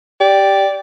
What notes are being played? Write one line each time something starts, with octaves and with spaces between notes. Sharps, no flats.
G4 D5